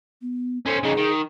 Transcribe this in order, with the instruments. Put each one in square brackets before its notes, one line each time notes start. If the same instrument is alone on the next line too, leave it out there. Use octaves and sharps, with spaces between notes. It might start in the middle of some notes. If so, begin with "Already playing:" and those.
[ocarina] B3
[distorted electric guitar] C#4 C5 [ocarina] A4
[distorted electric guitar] C#3 D#4 [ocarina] G#4
[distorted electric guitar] D#3